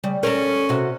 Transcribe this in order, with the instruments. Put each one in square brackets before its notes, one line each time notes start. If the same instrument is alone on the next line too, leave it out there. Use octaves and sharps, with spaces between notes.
[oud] C#3 G3
[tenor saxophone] C#4 [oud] A4 A#4
[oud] C3 F#4